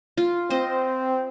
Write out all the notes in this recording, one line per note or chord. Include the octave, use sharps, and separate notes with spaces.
F4
C4 C5 D#5